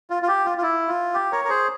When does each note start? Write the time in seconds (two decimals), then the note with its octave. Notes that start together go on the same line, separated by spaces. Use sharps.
0.10 F4
0.23 F4
0.28 G4
0.45 F4
0.58 F4
0.63 E4
0.88 F4
1.14 G4
1.32 A#4 C#5
1.45 A#4
1.49 G#4 C5